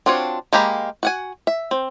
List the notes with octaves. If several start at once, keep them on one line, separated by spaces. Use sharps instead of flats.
C4 D4 F4 F#4 C#5
G#3 A#3 G4 A#5 B5
F#4 F#5 G#5
E5
C4